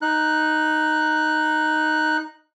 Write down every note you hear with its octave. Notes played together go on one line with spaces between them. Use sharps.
D#4 F#6